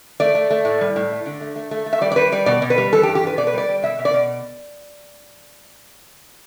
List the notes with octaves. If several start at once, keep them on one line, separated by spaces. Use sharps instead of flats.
A3 D5
A3
A3
A2
G3
A2
A3
D3
A3
A3
A3
A3
E5
G3 D5
D5
G3 B4
G3 D5
B2 D5
B2
B4
G3
E3 A4
G4
G2
G4
G2 B4
B2 D5
B4
G3 D5
G3
B2 E5
B2
D5
B2